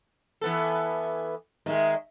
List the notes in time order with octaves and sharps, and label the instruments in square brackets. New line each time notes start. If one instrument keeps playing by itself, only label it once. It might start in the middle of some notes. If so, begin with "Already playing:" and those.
[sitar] E3 B3 A4
[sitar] D#3 G#3 [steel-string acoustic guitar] D#5 E5